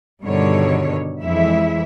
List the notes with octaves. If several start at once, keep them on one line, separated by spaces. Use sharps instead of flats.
G2 B2 D3 D#3 G3 C#5
F2 E3 G#3 E4 E5